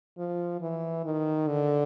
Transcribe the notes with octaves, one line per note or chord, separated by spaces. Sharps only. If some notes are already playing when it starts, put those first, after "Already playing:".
F3
E3
D#3
D3